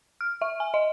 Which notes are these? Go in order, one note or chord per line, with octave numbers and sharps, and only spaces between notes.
F6
E5
G#5
D#5